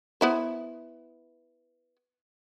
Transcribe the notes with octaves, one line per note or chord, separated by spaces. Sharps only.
B3 E4 C5